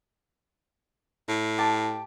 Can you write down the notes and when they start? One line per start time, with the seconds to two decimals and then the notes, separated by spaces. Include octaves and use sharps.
1.29 A2
1.58 G4 A5